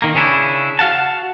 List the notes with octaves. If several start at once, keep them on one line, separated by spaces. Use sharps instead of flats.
D#3 A#3
C#3 C#4 D4 E4
F#4 F5 F#5 A5